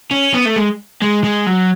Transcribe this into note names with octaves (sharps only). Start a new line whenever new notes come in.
C#4
B3
A3
G#3
G#3
G#3
F#3